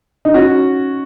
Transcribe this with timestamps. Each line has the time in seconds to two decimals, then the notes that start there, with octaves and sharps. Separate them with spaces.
0.25 D#4
0.34 C#4 F#4